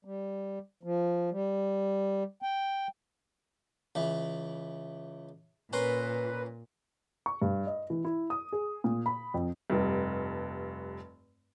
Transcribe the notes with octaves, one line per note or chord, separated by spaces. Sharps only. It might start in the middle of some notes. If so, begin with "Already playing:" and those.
G3
F3
G3
G5
C#2 E3
A#2 C#4 A#4 B4 C6
C#6
G2
D#5
E3
E4
D#6
G#4
A#2
B5
F2
F1 G2